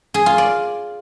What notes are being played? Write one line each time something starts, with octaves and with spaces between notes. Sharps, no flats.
G#4
F4
D5